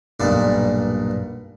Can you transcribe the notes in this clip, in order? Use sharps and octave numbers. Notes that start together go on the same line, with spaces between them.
B1 G2 A#2 D5